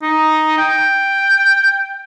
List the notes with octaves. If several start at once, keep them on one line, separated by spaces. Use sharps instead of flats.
D#4
G5